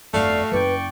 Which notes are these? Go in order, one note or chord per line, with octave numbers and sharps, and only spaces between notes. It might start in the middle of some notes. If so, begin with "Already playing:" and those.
G1 F2 A3 F#4 D5 F5
F#1 C#4 B4 D5 G5 C#6